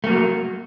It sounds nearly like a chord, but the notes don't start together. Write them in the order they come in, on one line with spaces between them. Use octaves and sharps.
A3 A#3 F#3